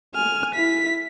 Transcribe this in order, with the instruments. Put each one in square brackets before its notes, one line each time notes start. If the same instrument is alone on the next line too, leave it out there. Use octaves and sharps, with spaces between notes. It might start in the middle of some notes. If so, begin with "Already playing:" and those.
[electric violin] G#5 F6
E4 B6